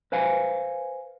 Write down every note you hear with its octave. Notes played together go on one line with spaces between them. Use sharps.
B4 C5 F5 G#5